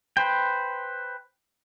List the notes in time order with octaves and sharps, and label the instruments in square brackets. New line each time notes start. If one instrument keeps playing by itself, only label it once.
[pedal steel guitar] B4 C5 G5